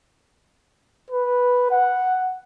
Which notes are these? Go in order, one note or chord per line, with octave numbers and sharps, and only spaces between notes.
B4
F#5